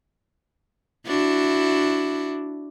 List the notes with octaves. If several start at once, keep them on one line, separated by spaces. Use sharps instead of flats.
D4 E4 F#4